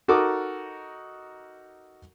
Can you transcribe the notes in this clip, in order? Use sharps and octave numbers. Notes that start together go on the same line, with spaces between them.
D#4 F#4 A4 A#4 D6 D#6